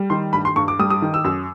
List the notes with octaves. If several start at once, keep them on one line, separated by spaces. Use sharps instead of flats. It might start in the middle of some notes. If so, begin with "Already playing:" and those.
Already playing: G3
D#3 C6
G2 B5
C6
G2 C#6
D6
G3 D#6
D#6
D#3
E6
F#2 E6